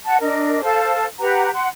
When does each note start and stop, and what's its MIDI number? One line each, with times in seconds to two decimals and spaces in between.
0.05 0.17 78
0.05 0.17 81
0.21 0.60 62
0.21 0.60 70
0.21 0.60 75
0.62 1.05 69
0.62 1.05 72
0.62 1.05 77
0.62 1.05 81
1.19 1.49 67
1.19 1.49 71
1.19 1.49 78
1.19 1.49 82
1.54 1.68 78
1.54 1.68 84